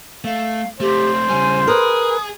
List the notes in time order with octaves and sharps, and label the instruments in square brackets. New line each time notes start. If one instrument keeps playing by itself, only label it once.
[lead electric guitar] A3 [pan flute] F5
[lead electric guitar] A3 C4 [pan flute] G4 [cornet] C5
[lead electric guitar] C#3 G3 [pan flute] G#5
[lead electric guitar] G#4 [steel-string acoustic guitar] A#4 B4 [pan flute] D#6